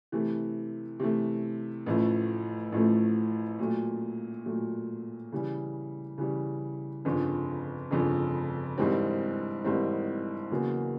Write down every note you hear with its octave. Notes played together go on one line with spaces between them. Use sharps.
C3 E3 A3
C3 E3 A3
A1 A2 F3 A3
A1 A2 F3 A3
A#2 F#3 A3
A#2 F#3 A3
C#3 E3 G3
C#3 E3 G3
G1 F2 C#3
G1 F2 C#3
G#1 G#2 E3 G3 C4
G#1 G#2 E3 G3 C4
E2 C#3 F#3 A#3